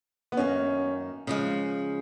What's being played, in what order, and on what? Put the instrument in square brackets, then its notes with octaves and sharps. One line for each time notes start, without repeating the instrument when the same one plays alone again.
[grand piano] B3
[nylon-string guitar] F#2 D#3 A#3 [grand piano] C#4
[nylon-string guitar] C#3 F3 G#3